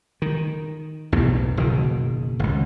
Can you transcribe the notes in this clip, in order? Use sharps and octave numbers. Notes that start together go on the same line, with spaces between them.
D#3
B1 E2 A2 C3
F#1 B2 D#3
G#1 C#2